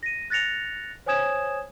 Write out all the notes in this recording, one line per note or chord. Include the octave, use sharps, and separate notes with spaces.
A#6 D#7
F#6 A6 A#6 C#7 F7
C5 C#5 G#5 D#6 G#6 E7